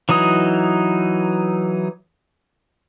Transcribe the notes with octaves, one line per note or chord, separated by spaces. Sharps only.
E3 F#3 D#4 D#6